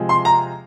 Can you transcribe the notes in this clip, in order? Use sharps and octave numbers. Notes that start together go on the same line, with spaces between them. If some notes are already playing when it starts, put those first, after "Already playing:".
Already playing: C3 F3 G#3
C6
A#5